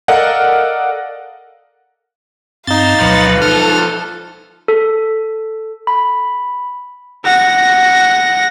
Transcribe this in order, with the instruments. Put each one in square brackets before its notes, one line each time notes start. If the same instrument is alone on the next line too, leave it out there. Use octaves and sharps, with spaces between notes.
[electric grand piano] A4 A#4 D5 D#5 F5 F#5
[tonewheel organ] G2 C4 [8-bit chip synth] D#4 A6 [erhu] F5
[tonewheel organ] D2 B2 F#3 [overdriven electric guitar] F3 B4
[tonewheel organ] D#4 [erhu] A4 [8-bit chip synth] F6
[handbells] A4
B5
[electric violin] F#5 A#6